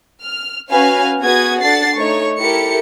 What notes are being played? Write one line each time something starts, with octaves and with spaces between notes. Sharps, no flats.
F6
C#4 F#4 B4 F5 G#5 F6
B3 F#4 G#4 B4 D#6 G#6
D4 A4 F#5 A6 C7
A3 D#4 C#5 C#6
E4 G4 A4 A#4 C#7